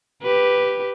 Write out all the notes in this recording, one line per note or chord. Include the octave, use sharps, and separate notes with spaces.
G4 B4